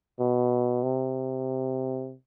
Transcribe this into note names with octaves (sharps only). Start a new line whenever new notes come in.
B2
C3